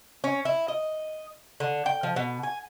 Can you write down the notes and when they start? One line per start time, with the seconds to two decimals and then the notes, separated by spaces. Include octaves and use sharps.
0.24 C#4
0.45 E4
0.68 D#5
1.60 D3
1.86 G5
2.03 F3
2.16 B2
2.43 G#5